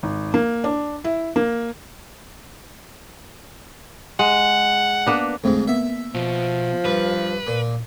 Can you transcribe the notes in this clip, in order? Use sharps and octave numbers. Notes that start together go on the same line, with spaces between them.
G#1
A#3
D4
E4
A#3
G#3 F#5
A#3 B3 D4
F2 G#2 D3 A3 C4
A#3 B3 E5
B2 F3
G2 B4
A#2